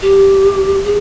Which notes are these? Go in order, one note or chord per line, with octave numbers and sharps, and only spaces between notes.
G4
G#4